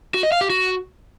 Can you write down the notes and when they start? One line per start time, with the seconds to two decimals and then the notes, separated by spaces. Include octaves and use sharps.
0.14 F#4
0.23 D#5
0.32 F5
0.41 G4
0.50 F#4